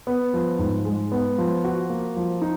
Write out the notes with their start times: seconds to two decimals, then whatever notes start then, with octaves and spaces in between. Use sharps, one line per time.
0.07 B3
0.34 F3
0.59 G#2
0.85 G#3
1.12 B3
1.38 F3
1.64 F#4
1.90 A#3
2.16 F3
2.42 D#4